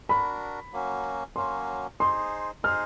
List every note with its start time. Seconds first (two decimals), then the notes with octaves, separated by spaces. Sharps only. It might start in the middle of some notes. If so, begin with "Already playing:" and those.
0.09 D4 F#4 A#4 B5
0.73 F#3 A#3 C#4 F#4
1.36 F#3 A#3 C#4 F#4 C6
1.99 D#4 G#4 C5 C6
2.63 D#4 G#4 C5 F6